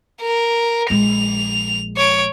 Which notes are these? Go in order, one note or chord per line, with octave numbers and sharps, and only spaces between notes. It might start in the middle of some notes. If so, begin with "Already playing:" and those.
A#4
A#1 G#3 F7
C#5 D7